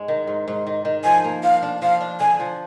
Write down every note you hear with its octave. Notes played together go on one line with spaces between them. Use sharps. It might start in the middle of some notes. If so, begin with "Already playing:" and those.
Already playing: G#2 G#3
D#3
G#2
G#2
D#3
D#3
F3 G#5
A#3
F3 F5
D4
F3 F5
D4
D3 G#5
F3